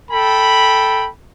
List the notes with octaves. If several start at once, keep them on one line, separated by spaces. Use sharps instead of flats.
A4 G5 B5